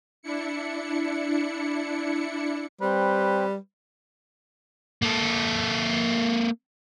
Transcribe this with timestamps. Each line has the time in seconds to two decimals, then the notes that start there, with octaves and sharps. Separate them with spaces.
0.22 D4 E4 C#7
2.81 G3 C4 B4 C5
5.02 A#3 A4